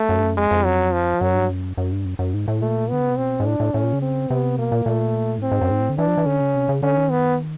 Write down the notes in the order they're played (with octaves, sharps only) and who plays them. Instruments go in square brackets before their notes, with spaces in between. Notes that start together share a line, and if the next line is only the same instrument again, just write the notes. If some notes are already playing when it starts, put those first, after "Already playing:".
Already playing: [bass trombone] A3
[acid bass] F#2
G2
F#2
[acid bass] F2 [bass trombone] G#3
[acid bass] F2
[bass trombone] F#3
F3
[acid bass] F#2 [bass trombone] F#3
[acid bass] G2
F#2
F#2
G2
F#2
F#2
G#2
A2
[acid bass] A#2 [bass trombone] A3
[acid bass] D3 [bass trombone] B3
[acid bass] C#3
C3
[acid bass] B2 [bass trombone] C4
[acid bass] G#2
[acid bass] A2 [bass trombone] D4
[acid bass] A2
[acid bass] A2 [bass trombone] C#4
[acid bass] A#2
C#3
[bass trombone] C4
[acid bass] C3 [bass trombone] B3
[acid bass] B2 [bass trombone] A#3
[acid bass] A#2
[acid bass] A#2 [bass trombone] A3
[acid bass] G#2
[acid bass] A2 [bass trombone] C4
[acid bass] G#2
F#2
G#2
A2
D3
[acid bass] E3 [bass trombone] D4
[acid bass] F3
E3
[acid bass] D3 [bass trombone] C#4
[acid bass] C#3
C3
C#3
[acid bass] D3 [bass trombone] C#4
[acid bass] D#3
[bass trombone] B3